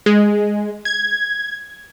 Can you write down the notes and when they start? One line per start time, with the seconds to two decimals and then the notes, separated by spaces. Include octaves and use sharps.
0.06 G#3
0.85 G#6